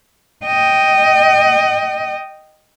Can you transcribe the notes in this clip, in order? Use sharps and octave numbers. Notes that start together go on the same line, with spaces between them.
D#5 G5